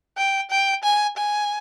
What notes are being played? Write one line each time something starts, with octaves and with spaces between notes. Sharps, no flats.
G5
G5
G#5
G#5